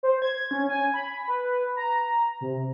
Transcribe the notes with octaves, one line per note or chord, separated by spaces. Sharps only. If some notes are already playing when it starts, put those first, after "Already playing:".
C5
G#6
C#4
G#5
B5
B4
A#5
C3